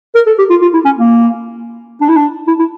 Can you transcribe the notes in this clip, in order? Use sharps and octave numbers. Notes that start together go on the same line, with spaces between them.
A#4
A4
G4
F4
F4
E4
C#4
A#3
D4
E4
D4
E4
E4